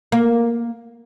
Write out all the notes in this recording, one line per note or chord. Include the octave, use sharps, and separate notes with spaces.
A#3